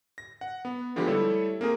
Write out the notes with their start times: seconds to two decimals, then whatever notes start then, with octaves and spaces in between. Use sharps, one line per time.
0.18 A#6
0.41 F#5
0.65 B3
0.96 D3 F3 G#3 B3 G4 B4
1.07 G3 A3 E4 A4 C#5
1.61 A#3 C4 G#4 A#4